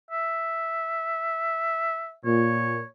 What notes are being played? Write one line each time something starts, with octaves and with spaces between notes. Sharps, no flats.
E5
A#2 C#5